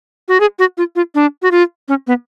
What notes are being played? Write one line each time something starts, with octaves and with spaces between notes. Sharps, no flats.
F#4
G#4
F#4
F4
F4
D4
F#4
F4
C#4
B3